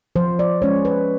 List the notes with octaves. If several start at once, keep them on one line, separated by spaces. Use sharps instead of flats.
F3 C5
D5
G#3 C#4 C#5
B4